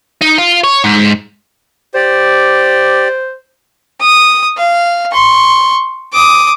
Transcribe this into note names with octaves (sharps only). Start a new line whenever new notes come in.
D#4
F4
C#5
G#2
G4 C5 D5
D#6
F5
C6 C#6
D6 D#6